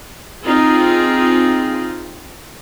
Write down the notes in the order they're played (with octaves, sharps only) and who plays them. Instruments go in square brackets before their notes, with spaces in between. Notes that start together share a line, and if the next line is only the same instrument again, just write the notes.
[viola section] C4 D#4 F4 G#4